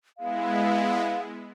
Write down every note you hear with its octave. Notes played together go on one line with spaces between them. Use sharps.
G#3 B3 E4 F5